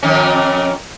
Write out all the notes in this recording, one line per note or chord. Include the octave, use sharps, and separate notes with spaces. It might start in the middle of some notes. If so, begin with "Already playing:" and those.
F2 D#3 C#4